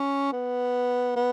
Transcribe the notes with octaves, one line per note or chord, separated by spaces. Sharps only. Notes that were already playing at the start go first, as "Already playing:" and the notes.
Already playing: C#4
B3
B3